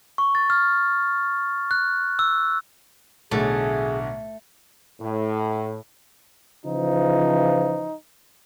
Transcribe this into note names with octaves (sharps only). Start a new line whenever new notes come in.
C#6
A6
F6
F#6
E6
B1 A2 D3 A3 G#4
A2
C#3 E3 F3 D#4